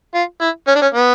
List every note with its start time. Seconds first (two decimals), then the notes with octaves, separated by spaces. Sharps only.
0.14 F4
0.41 E4
0.67 C#4
0.75 D4
0.82 C#4
0.94 B3